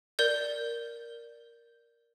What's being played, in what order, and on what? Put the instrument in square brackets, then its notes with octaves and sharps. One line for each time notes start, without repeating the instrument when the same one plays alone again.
[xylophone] A#4 D5 G6